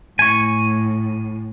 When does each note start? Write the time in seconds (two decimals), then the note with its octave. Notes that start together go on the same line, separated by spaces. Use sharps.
0.19 A2 G#5 C#6